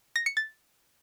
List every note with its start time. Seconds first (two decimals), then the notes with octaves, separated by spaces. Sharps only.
0.16 A#6
0.26 C#7
0.37 A6